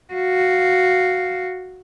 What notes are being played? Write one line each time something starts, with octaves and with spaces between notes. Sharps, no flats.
F#4 F5